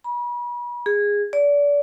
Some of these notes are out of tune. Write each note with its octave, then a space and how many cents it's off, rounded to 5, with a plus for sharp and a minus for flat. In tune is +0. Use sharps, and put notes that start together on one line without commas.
B5 -40
G#4 -15
D5 -30